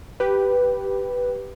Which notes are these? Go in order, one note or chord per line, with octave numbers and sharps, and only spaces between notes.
G4 B4